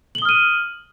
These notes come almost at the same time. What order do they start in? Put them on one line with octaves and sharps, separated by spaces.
F#7 G7 D#6 F6 D#7